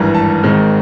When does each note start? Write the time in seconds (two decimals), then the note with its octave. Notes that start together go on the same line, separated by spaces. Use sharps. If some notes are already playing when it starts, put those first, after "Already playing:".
Already playing: G#1 G2 E3 A#5
0.14 A5
0.43 G#1 G#2 D#3 G#3 C4